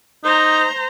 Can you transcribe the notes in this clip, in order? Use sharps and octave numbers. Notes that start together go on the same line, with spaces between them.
D#4 C5 A#5